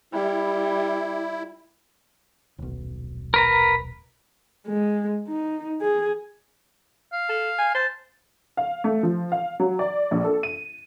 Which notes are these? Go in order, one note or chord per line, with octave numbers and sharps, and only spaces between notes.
G3 E4
D#1 B1
A#4 B4 A#5
G#3
D#4
G#4
F5
A4
G#5
C5 A5
F5
A3
F3
F5
F#3
D5
A#1
A4
D#7